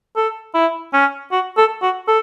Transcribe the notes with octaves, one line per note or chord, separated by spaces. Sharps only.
A4
E4
C#4
F#4
A4
F#4
A4